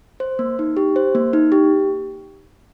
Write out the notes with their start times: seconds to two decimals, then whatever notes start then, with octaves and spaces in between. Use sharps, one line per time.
0.20 C5
0.39 A#3
0.59 D#4
0.77 G4
0.96 C5
1.15 A#3
1.33 D#4
1.52 G4